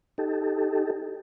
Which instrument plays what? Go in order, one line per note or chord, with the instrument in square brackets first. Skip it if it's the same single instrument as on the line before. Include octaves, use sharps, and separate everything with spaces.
[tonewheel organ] D#4 G4 A4